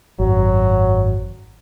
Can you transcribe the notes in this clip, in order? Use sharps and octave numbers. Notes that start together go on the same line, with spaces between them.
G#1 F#2 F#3